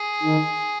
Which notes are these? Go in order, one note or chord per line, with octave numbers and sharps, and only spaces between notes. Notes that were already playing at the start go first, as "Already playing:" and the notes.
Already playing: G#4
D#3